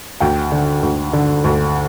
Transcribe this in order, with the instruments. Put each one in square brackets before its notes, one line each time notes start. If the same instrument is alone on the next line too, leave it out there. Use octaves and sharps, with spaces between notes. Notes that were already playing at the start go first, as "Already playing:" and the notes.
[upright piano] D2 G5
D3
D2
D3
D2